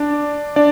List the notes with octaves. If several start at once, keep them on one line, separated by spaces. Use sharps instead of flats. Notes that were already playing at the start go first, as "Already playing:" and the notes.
Already playing: D4 D5
D4 D5